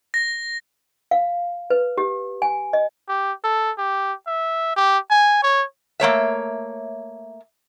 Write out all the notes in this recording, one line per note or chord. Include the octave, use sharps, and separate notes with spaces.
A#6
F5
B4
G4
G#5
D#5
G4
A4
G4
E5
G4
G#5
C#5
A3 A#3 C#5 E5